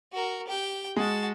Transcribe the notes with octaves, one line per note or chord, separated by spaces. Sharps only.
F#4 A#4
G4 G5
G#3 F#4 A5